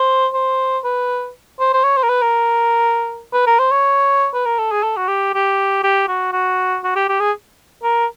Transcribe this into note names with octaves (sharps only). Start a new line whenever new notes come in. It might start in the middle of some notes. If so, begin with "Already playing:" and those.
Already playing: C5
C5
B4
C5
C5
C#5
C5
A#4
B4
A#4
B4
A#4
C5
C#5
B4
A#4
A4
G#4
A4
F#4
G4
G4
G4
F#4
F#4
F#4
G4
G4
G#4
A#4